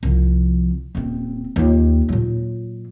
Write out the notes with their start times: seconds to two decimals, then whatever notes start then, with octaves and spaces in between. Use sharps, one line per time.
0.03 C2 F3
0.95 D#1 C4
1.56 D#2 F4
2.09 A#2 F#3